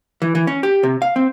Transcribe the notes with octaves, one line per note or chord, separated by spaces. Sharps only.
E3
E3
C#4
G4
C3
F5
C4